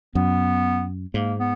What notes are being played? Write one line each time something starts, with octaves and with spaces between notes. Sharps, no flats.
F#2 B3
G#2 A#3
B3